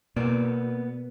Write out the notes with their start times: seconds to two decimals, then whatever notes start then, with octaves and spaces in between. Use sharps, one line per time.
0.16 B2 A#3 B3 D5